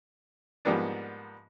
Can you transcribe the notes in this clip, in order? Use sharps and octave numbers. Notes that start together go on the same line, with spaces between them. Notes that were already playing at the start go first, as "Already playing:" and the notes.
G#2 F3 G3 A#3 B3 D4